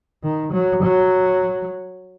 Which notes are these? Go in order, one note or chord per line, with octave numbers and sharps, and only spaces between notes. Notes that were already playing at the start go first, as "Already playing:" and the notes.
D#3
F#3
F#3